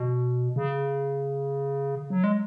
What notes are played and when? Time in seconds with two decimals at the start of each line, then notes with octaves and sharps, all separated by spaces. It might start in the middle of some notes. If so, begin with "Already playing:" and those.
Already playing: B2
0.56 C#3
2.10 F#3
2.24 G#3